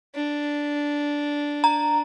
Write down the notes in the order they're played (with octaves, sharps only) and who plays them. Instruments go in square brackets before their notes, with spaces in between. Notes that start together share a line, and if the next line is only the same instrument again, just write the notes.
[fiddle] D4
[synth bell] A#5